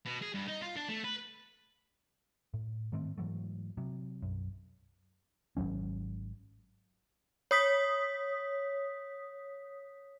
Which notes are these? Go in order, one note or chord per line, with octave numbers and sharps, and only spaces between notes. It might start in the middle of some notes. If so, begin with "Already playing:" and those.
B2
G#4
G2
D#4
F4
D4
A3
B4
A2
G#2 D#3 A3 C4
G#2 E3 F#3 A3
C3 F#3
B1 F#2
G#1 D#2 F#3 C#4
C#5 D#6 B6